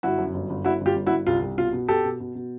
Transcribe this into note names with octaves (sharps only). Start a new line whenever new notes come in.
G1 E4 F#4
F#2
G1
G1
G1 E4 F#4
G1 F4 G4
G1
E4 F#4
G1
C2 F4
C2
B2 F4
B2
B2 G4 A4
B2
B2
B2